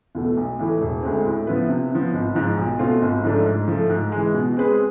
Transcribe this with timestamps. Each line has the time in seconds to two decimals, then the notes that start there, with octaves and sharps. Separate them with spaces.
0.15 E2 B2 A3
0.37 B1
0.59 A2 E3 A3
0.81 E1
1.03 D2 D3 G#3 C4
1.25 A2
1.47 F3 B3 E4 B4
1.69 C3
1.91 F3 B3
2.13 G#1
2.35 G#2 F3 G#3
2.57 B1
2.79 B2 A3 C4 F4
3.02 G#1
3.23 G#2 F3 A3 D4
3.46 G#2
3.68 F3 A3
3.89 G#2
4.12 E3 G#3
4.34 B2
4.57 G#3 C4 G#4 B4